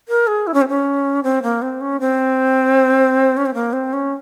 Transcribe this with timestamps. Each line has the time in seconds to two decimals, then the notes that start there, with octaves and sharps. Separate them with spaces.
0.08 A#4
0.27 G#4
0.47 E4
0.54 C#4
0.61 C4
0.68 C#4
1.23 C4
1.43 A#3
1.62 C4
1.81 C#4
2.00 C4
3.37 C#4
3.46 C4
3.54 A#3
3.73 C4
3.93 C#4